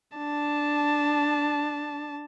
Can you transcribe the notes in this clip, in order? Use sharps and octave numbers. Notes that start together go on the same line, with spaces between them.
D4 A5